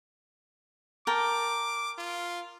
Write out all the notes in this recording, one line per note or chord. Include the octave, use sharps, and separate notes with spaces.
A#4 G5 A5 D6
F4